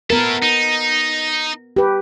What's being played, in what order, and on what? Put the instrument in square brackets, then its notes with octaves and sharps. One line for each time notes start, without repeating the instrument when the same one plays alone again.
[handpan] B3 A#4 [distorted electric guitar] E4 A4
[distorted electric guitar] D#4
[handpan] G4 B4